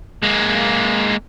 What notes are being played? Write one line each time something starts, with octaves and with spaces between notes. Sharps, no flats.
G#3 A#3